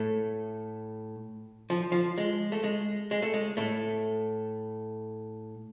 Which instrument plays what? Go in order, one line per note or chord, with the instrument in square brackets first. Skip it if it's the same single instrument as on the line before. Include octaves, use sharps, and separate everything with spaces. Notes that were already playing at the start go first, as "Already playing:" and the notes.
Already playing: [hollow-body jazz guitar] A2 A3
F3
F3
G#3
A3
G#3
G#3
A3
G#3
A2 A3